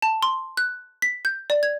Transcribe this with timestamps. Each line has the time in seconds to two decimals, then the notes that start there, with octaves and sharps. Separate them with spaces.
0.02 A5
0.23 C6
0.57 F#6
1.02 B6
1.25 G6
1.50 D5
1.63 G#6